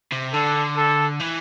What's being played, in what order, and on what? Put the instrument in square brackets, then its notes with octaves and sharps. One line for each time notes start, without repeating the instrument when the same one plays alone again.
[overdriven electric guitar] C3
[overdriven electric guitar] D3 [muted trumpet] A4
[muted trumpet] A4
[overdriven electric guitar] E3